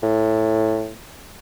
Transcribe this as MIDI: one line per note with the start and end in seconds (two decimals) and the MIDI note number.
0.03 0.92 45